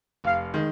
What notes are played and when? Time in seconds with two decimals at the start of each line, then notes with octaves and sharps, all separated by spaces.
0.24 F1 F5
0.54 D#3 G#3